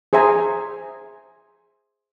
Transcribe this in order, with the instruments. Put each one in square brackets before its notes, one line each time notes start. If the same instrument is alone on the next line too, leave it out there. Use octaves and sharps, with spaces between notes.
[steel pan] G#4 C5 E5 G#5 A#5